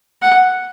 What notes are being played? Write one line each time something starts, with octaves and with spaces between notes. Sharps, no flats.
F#5